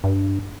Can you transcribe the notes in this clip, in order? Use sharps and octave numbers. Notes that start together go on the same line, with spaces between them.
G2